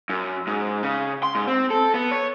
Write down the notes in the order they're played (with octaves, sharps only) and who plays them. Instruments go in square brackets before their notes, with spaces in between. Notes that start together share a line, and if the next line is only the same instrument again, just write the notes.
[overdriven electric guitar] F#2
G#2
C#3
C6
G#2
C4
A4
B3
C#5